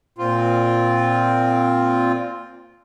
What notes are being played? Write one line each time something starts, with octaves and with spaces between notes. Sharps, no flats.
A#2 C4 F4